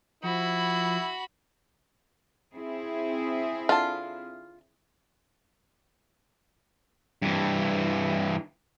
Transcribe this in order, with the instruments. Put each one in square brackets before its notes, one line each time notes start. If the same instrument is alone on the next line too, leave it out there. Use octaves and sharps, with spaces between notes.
[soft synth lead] F3 [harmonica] E4 [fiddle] F#4 B5
[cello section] C4 E4 G#4
[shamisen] D3 A5 [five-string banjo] F4
[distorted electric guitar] G2 E3